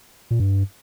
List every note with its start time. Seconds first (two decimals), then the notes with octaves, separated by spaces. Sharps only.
0.31 A#2
0.40 G2